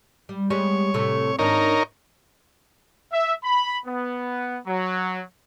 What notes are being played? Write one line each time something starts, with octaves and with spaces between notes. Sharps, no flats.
G3
G3 G#3 B3 C#5
A2 C3 A3
G#2 D#3 D4 D#4 A#4 C#5
E5
B5
B3
F#3